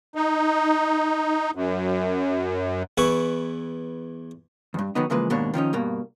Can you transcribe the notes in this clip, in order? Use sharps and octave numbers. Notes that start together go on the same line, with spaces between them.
D#4
F#2
E2 E4 B4 C#6
E2 G2
D#3 F#3 B3 D#4
C#3 E3 F3 G#3 A#3 B4
D#2 G#2 B2 A#3 D4 C#5
D#3 F3 C#4 D#4
G2 B2 A#3